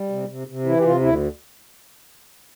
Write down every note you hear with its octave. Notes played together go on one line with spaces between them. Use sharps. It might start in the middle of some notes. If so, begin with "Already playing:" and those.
Already playing: G3
C3
C3
C3
E3 E4
G4
C3 F4
D2 E4